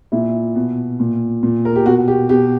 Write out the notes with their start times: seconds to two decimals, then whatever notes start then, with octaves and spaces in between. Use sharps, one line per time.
0.12 A#2 E4
0.55 B2
1.00 A#2
1.43 A#2
1.65 A#4
1.76 G4
1.86 B2 F#4
2.08 G4
2.29 B2 G4